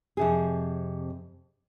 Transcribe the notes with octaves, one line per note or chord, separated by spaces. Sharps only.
F2 C3 G#4